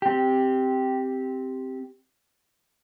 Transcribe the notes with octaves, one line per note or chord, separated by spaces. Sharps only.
C4 G4